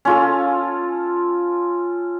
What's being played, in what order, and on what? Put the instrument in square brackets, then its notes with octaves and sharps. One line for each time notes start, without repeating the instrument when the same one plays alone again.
[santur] C#4 F4 A4